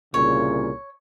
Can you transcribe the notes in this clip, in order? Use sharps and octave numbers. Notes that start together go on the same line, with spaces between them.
C2 A#2 C#3 C#5